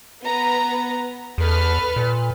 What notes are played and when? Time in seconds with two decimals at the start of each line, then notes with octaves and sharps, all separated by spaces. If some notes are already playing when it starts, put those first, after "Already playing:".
0.22 B3 B4 A#5
1.38 E2 A4 B4 F6
1.96 A#2